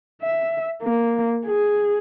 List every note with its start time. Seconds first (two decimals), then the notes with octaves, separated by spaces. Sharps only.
0.22 E5
0.82 A#3
1.46 G#4